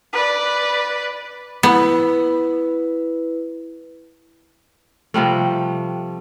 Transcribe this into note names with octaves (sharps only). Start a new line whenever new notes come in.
B4 D5
B3 E4 B4
C3 F3 G3 A3